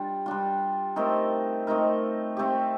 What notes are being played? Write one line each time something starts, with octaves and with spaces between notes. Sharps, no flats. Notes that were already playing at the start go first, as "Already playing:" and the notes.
Already playing: G3 D4 F4
G3 D4 F4
A3 C4 D#4 A#4
A3 C4 D#4 A#4
A3 C4 G4